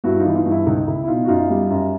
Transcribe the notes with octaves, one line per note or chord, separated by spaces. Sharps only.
G2 E4 F#4
D#4 F4
E3 E4
D#4 F4
G2
E4
C#2 D#4
C#2 E4
E4
B2 D#4 F4
F#4
F#2 D#4 F4
G3
F#2